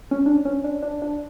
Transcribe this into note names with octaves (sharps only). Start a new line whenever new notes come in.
C#4
D4
C#4
D4
D4
D4